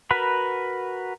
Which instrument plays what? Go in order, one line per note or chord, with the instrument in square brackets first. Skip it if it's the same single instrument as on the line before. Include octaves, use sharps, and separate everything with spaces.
[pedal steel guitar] F#4 A#4 B4 F#5 B5